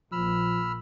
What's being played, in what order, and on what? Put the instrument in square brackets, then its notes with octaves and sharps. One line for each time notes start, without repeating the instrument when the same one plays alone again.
[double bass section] A#1 A#2 [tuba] F3 [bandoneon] B5 E6 F6